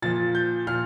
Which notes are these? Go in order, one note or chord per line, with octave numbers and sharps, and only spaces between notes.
A#2 F3 A6
G6
A#2 F6